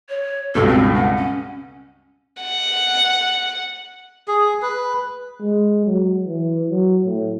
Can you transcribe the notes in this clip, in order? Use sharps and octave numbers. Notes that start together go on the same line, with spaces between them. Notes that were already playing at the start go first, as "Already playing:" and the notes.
C#5
C#2 G2 B2 A4
C4
F#5
C#4
F#5
G#4
B4
G#3
F#3
E3
F#3
A2